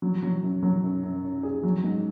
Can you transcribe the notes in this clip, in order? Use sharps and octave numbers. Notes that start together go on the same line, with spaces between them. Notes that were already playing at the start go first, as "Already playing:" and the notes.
F#3
F#3
F#2
F#3
F#2
F#2
C#4
G#4
F#3
G#2